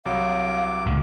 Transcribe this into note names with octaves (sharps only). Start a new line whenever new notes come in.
C2 F#3 F5 D6
C#2 A#2 D3